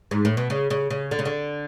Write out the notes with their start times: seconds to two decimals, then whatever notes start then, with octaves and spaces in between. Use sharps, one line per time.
0.11 G#2
0.25 A2
0.37 B2
0.50 C#3
0.70 C#3
0.90 C#3
1.11 D3
1.19 C#3
1.25 D3